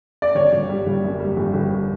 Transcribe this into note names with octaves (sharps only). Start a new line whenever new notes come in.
D5
G1 C#5
G1
G3
G1
F#2
G3
G1
G1